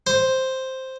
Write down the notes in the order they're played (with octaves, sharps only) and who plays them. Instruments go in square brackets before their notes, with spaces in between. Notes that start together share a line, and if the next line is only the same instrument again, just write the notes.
[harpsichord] C5